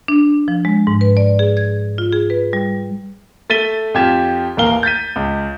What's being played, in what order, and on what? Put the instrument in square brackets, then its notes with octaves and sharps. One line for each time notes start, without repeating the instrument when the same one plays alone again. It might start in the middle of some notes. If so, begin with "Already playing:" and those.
[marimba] D4
F3
G#3
G#2
B4
D5
G#4
G#6
F4
G#4
B4
G3
[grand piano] A3 A6 B6 D#7 G7
F2 F4 G4 G#6 E7
A1 D#2 A#3 A#4 F5 G7
G6 A6 B6 D#7
C#2